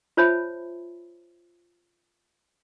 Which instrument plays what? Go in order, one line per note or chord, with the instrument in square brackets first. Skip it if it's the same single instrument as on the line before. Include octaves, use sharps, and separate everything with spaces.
[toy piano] F4 C5 C#5 E5 A5 B5